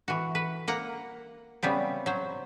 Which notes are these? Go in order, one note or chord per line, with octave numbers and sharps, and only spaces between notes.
E3 F#4
B4
A#3 F#5 A#5
C#3 G3 B3 C4
F#3 C5